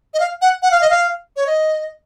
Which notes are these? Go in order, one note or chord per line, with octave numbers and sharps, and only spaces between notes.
D#5
F5
F#5
F#5
F5
D#5
F5
C#5
D#5